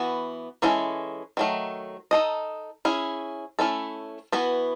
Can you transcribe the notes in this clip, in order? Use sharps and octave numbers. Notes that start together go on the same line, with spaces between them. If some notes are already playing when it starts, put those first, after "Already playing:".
Already playing: E3 B3 F#4
E3 G#3 C#4 E4 A4
D#3 F#3 A3
D#4 A4 D#5
C#4 E4 G#4
A3 C#4 E4 A4
E3 B3 F#4 B4